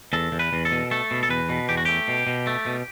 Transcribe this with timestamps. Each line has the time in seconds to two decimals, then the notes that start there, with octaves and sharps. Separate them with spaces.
0.13 E2 A4
0.32 E2
0.39 B4
0.53 E2
0.65 A4
0.72 B2
0.91 A3 A4
1.11 B2
1.23 A4
1.29 E2 B4
1.49 B2
1.69 E2 G4
1.77 F#4
1.85 A3 G4
2.08 B2
2.27 B2
2.47 A3
2.66 B2